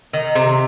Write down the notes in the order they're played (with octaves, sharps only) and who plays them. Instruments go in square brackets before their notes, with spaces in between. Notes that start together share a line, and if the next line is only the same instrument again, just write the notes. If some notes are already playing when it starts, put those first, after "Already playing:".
[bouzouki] D#3
C3